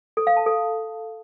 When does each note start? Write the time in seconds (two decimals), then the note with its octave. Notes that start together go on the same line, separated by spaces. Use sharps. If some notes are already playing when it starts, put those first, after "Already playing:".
0.17 A4
0.27 F5
0.37 A5
0.46 A4